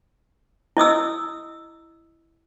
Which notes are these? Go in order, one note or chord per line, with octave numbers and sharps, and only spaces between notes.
E4 D#5 D#6 E6